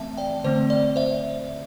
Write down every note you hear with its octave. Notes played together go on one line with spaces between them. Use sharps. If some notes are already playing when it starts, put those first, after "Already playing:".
Already playing: E3 A3 C4 E5 A5
D5 G5
D3 A3 C4 C5
D5
C5 E5